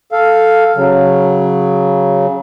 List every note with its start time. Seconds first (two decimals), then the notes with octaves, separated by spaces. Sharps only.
0.12 A4 F5
0.76 C#3 F#3